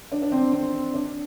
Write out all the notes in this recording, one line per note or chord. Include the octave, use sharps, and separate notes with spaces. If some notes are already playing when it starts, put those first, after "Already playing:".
D4
D4
C4
C4
D4